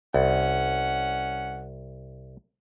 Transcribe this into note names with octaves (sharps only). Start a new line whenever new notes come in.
C2 C#4 F#5